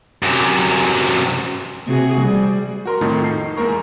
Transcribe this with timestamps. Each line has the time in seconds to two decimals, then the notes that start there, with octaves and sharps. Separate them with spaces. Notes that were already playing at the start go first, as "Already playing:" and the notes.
0.23 F#2 C3
1.87 C3 F#4 G#4
2.21 G3
2.85 F#4 A#4 C6
3.01 F2 A2 D#3 A3
3.24 D#4 C7
3.57 E2 G#3 A#3 A#4 A#5 C#6